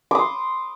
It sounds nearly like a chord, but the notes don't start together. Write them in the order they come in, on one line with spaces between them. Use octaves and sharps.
D6 D#6 C6